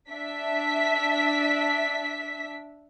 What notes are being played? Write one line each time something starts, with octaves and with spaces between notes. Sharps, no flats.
D4 E5 B6